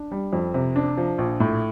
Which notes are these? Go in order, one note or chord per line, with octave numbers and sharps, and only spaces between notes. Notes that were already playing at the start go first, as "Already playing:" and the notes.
Already playing: D4
G3
F2
C3
D4
F3
A#1
A2